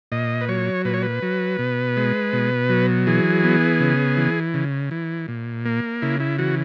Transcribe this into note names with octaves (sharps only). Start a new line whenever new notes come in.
A#2 D#5
B4
F#3 C#5
A#2 B4
C#5
B4
F#3
B2
G#3
B2
F#3
E3 G#4
B3
C#3
E3
C#3
E3
A#2
A#3
C#3 E4
E4
E3 F#4